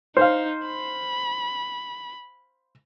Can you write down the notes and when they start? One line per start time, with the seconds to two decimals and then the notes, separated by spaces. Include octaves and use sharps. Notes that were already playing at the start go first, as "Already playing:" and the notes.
0.17 D#4 C5 F5
0.67 B5